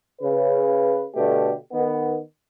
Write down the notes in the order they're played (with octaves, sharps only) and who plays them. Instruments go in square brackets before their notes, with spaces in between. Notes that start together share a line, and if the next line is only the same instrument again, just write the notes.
[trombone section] C#3 B4
B2 D3 A3 G4
D#3 B3